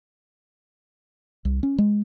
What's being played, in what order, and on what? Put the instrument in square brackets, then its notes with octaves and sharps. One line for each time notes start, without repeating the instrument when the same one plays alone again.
[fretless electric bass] C2
C#4
G#3